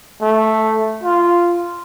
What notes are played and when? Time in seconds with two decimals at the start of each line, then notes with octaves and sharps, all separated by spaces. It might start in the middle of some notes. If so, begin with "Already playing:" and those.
0.21 A3
1.04 F4